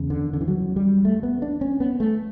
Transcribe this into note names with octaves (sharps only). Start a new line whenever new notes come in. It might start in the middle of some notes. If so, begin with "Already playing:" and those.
Already playing: E2 C#3
D3
D3
E3
F#3
G3
A3
B3
D4
C#4
B3
A3